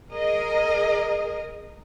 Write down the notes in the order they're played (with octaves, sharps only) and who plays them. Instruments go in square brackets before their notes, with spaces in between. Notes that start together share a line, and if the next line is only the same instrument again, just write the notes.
[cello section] G#4 A#4 D#5